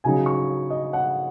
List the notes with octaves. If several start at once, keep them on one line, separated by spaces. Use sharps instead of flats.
C#3 F#3 D#4 G#5
C#6
D#5
F#5